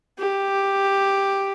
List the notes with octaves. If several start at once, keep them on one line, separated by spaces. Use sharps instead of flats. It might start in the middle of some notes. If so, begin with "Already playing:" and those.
G4